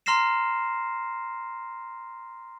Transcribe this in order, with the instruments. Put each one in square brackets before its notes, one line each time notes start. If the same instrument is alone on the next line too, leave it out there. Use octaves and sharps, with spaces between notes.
[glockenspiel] A#5 C6 F6 A#6 C7 E7